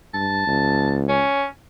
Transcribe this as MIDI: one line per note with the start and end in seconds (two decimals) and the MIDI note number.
0.14 0.44 43
0.14 0.96 81
0.47 1.24 37
1.08 1.45 61